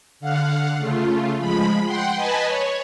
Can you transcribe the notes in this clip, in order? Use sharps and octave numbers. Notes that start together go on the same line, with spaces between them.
D3 F5 F#5
C#3 A3 F4
F3 G#3 B5
F#5 G5 C6
B4 D#5 G#5 A5 B5
C#5